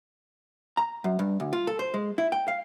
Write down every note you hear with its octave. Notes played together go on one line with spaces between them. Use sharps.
A#5
F#2
G2
D2
F4
A4
C5
G#3
E4
G5
F5